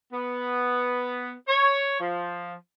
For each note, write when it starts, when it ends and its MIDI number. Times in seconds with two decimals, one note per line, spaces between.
0.12 1.32 59
1.47 1.96 73
1.99 2.53 53